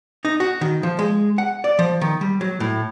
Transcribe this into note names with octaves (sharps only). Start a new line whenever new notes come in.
D#4
F#4
D#3
F3
G#3
F#5
D5
F3
D#3
G3
F#3
A2